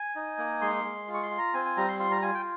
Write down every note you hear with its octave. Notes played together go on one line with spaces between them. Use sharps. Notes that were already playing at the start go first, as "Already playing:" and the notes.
Already playing: G#5
D#4
A#3
G#3 C6
G#3
F4
C#6
C6
F4
A#5
C4 G#5
G#5
G3 A#5
C6
F4 C6
A#5
F4 G#5
G5